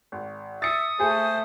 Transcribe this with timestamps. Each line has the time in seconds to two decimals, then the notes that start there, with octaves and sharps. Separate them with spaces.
0.12 G#1
0.62 E5 D#6 A6 C#7
1.00 A3 G#4 C5